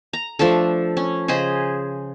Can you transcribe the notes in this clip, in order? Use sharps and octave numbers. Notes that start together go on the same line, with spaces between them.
A#5
F3 A3 D4 A4
C#4
C#3 G#4 C5 D#5